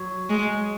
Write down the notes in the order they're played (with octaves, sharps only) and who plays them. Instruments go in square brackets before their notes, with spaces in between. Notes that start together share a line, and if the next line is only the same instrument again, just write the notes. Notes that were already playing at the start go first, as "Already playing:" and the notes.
Already playing: [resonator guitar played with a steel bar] F#3
[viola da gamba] G#3